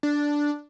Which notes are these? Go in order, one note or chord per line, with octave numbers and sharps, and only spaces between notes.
D4